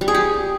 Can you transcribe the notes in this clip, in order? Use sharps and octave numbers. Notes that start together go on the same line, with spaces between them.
G3
G#4
G4